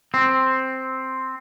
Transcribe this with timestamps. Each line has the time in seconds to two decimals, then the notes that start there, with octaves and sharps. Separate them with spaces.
0.14 C4